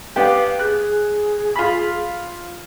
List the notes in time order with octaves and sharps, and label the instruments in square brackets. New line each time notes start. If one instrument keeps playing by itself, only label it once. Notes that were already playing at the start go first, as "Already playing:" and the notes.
[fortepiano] B3 D4 G4 [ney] F5
[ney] G#4 [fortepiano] F#6
[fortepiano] F4 B5